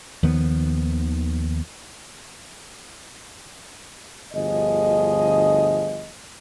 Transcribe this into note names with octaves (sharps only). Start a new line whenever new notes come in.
D#2 D#3 F3 B3
G1 D2 F3 G#4 D#5